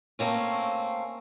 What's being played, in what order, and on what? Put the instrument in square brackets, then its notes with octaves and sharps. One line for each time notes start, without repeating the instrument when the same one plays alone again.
[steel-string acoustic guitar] A3 A#3 C4 C#4